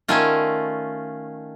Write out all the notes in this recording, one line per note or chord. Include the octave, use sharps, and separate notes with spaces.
D#3 A3 C#4 F4